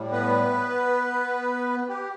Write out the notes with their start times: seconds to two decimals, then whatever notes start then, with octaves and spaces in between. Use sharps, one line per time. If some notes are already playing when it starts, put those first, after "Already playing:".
Already playing: A2 G3
0.12 B3 B4
1.88 G4